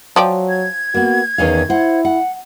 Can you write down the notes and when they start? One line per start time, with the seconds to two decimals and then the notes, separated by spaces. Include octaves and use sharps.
0.16 F3 F#3 D5 G5
0.49 G#6
0.94 A#3 B3 F#4
1.38 E2 D#3 C#4 F5
1.70 E4 C5 F#5
2.05 F#5